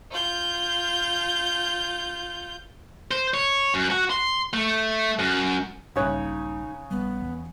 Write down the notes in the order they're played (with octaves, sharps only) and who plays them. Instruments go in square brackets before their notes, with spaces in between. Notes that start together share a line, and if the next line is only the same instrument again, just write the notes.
[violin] F4 G6
[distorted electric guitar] C5
C#5
F#2
F#4
C6
A3
F#2
[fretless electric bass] A#1 G2 A#2 [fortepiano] C#3 C#5 F#6 [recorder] D#4
[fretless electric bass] A#1 G3 [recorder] B3
[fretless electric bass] E2